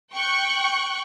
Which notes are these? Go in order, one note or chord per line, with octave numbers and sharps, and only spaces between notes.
G5 C#6 F#6